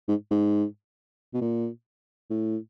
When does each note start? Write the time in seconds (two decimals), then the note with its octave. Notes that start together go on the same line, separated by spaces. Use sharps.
0.08 G#2
0.31 G#2
1.34 B2
1.41 A#2
2.30 A2